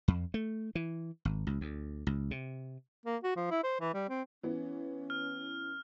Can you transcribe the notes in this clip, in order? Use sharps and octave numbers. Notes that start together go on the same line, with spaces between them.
F2
A3
E3
G#1
C#2
D2
C#2
C3
A#3
F#4
F3
E4
C5
E3
G3
C4
E3 B3 C#4
F6